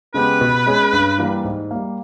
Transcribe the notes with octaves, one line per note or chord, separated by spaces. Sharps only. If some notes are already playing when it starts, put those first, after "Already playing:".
C#3 G#3 B3 G4 B4
B2
G#3 C#4 G#4
G2
E3 G3 A#3
G#2
G3 A#3